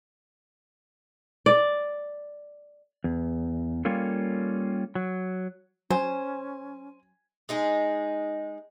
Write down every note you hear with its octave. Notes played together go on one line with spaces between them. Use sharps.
D5
E2
G3 A#3 C#4 F4 A4
F#3
F#3 C#4 C5 G#5
G#3 D#4 G#4